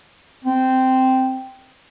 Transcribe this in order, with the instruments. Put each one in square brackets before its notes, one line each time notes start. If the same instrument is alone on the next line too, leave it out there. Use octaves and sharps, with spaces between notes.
[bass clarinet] C4